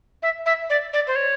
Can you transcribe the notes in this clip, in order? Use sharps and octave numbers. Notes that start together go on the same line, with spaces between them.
E5
E5
D5
D5
C5
C#5